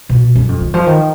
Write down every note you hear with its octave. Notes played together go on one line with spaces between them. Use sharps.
B2
F#2
F2
D#3
F3
D#3